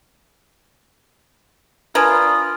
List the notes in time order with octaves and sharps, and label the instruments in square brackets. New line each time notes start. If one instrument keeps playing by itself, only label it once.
[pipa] D4 A#4 B4 [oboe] F4 [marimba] G#5 G#6 [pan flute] D#6